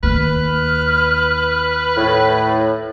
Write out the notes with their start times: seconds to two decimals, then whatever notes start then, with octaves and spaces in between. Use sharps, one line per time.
0.03 D#2 B4 F6
1.96 A2